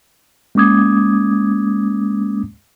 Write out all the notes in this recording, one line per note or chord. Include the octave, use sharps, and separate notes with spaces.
G#3 A#3 C#4 D6 D#6 G#6